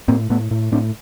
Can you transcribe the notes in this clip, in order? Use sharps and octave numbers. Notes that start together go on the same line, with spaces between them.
A2 A#3 C4
A2 A3 B3
A2
A2 C4 D4